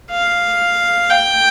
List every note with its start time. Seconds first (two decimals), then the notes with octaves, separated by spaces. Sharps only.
0.10 F5
1.10 G5